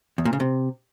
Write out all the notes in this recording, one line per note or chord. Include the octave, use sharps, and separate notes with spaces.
E2
A#2
C#3
C3